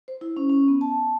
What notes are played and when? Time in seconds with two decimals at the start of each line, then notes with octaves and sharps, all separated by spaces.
0.08 C5
0.21 E4
0.37 C#4
0.49 C#4
0.68 B3
0.81 A5